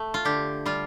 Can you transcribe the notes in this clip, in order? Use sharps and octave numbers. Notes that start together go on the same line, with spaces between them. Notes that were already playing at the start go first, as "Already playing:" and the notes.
Already playing: A3
F4
D3 G4
G3 F4